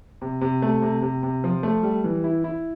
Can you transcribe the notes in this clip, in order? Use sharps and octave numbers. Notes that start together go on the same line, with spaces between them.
C3
C3
A3
C3
C3
C3
F3
A3
G3
E3
E4
E4